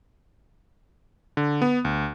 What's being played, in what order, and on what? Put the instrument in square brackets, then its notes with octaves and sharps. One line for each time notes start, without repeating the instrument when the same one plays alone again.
[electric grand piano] D3
B3
D2